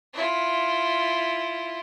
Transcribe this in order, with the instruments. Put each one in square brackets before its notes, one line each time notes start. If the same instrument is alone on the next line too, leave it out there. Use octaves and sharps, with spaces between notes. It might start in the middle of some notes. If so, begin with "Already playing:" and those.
[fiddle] E4 F4